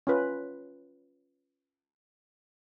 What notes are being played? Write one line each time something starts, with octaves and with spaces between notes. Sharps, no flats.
C#4 F4 B4